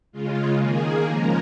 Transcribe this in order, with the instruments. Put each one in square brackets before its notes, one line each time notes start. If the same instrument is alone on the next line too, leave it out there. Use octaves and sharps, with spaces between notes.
[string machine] C#3 G#3 F4
D#3 A#3 G#4
C#3 F3 G#3 A#4